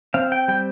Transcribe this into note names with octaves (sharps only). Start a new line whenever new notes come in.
C4 F5
G5
G3 G5